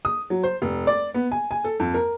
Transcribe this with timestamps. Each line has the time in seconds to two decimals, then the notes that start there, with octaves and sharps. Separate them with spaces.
0.05 D#6
0.30 F#3
0.43 C5
0.62 F1
0.87 D5
1.14 B3
1.32 G#5
1.51 G#5
1.64 A4
1.80 F2
1.94 A#4